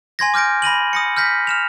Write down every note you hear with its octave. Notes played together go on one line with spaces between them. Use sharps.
G#5 C6 G#6 A#6
D6 F6 G6 A#6 D7
B5 A#6 D#7 F#7
D#6 A#6 C#7
F6 G6 A#6 B6
F6 E7 F7